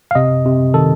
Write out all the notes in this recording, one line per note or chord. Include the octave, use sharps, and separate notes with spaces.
F5
C3 D#5
C3
D#3 A4